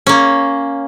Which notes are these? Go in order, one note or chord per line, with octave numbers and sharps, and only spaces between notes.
A#3 C#4